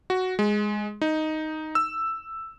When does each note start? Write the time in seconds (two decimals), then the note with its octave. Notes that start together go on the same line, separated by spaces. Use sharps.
0.10 F#4
0.39 G#3
1.01 D#4
1.75 E6